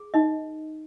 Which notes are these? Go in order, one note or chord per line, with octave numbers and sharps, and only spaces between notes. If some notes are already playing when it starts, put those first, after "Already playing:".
Already playing: G#4
D#4 D#5